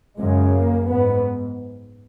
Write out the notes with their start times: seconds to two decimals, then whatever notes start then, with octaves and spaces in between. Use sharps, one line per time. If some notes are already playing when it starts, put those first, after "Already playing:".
0.18 F#2 C#3 G#3
0.53 A#3
0.89 G#2 B3